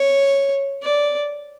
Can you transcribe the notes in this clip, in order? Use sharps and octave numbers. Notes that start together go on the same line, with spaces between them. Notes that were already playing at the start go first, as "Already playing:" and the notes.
Already playing: C#5
D5